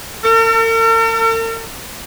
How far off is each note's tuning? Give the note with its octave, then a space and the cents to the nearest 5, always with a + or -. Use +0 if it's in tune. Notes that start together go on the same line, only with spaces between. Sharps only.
A#4 -45